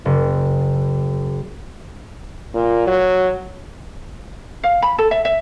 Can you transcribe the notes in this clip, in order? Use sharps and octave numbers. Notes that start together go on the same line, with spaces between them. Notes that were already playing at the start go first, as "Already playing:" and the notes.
F#1
A#2
F#3
F5
B5
A4
E5
E5